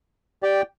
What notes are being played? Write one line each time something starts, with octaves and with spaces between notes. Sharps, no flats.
G4 D5 G5